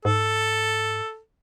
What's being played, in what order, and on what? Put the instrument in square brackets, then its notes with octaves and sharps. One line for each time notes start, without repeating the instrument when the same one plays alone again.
[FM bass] G#2 [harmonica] A4